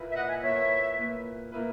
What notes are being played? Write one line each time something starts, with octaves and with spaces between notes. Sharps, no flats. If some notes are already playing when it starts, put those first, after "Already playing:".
Already playing: A#2 A#3 E4 B4
E5
D#5 F#5
E5 G#5
A#2 A#3 E4 B4 C#5 E5
A#2 A#3 E4 B4
A#2 A#3 E4 B4